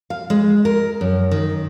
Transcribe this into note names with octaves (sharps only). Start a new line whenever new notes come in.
F5
G#3
A#4
F#2
D#3